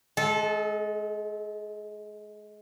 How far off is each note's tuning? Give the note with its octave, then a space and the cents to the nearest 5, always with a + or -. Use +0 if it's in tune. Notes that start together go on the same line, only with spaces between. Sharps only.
G#3 +25 A4 -20